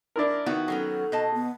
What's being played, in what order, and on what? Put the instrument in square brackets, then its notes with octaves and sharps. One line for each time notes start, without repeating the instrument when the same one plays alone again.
[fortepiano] D4 E4 A#4
[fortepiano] D#3 [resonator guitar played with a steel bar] B3 E4 F#4
[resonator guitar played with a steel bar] F#3 B3 C#4 [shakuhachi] A4
[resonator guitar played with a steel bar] B2 D#5 A5
[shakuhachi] B3